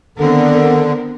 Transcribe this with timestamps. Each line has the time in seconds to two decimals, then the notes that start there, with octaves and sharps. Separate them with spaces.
0.18 D3 D#3 B3 C4 A#4